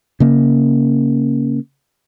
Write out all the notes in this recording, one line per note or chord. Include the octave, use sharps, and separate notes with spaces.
C#3 A#3